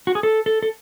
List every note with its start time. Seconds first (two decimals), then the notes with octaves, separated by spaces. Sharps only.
0.07 F#4
0.15 G#4
0.23 A4
0.46 A4
0.63 A4